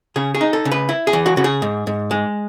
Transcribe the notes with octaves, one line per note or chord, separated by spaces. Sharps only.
C#3 G#4
G#4
D#4
A4
C#3
B4
E4
G#4
E3
F#4
C#3 F#4
G#4
G#2
G#2
G#3